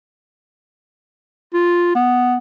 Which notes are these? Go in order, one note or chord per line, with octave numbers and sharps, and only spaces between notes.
F4
B3